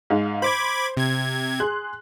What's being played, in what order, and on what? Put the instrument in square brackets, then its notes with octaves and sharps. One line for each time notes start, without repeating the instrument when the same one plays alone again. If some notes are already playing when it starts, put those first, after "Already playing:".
[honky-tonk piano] G#2 G#3 F5
[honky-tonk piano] C5 [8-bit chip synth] B5 D6 G#6
[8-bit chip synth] C3 G#6
[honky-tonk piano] G#4 C6 F#6